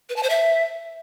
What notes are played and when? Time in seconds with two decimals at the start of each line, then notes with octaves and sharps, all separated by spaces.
0.09 B4
0.16 A5
0.23 C5
0.30 E5